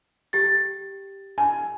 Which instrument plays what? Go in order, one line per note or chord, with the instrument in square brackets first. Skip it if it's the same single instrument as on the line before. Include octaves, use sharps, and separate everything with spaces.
[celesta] G4 A6
[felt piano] G#5